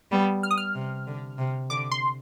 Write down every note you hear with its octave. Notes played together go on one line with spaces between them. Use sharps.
G3 B3
F6
D#6
F6
C3
D3
C3
D3 D6
C6